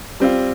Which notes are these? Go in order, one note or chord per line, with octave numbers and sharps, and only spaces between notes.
G3 C4 F4